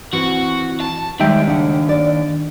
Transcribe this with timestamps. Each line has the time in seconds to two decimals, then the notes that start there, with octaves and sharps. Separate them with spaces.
0.13 E3 C4 F#4
0.80 A5
1.20 D#2 G3 G#3 D#4 E5 G5
1.48 C#3 D4 F#5
1.89 D5